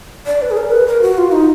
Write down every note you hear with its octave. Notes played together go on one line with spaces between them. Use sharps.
D5
B4
G#4
A#4
B4
A#4
F#4
F4
D#4